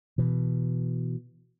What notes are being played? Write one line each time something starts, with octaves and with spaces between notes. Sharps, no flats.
B2 E3